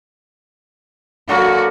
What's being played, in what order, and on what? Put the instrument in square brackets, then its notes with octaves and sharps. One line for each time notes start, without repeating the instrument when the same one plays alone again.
[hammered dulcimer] D3 F#3 A#3 [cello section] F#4